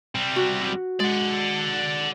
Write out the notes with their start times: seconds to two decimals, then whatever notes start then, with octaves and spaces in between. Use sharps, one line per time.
0.15 G3 C4
0.36 F#4
1.00 G#3 D5 F#5